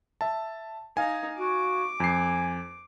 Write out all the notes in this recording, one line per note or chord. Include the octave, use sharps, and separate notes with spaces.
E5 A5
D#4 F5 G#5
F#4 D6
F2 G#5 C7